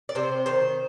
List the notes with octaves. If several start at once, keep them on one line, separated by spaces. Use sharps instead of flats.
D5
C3 C5
D#3 C5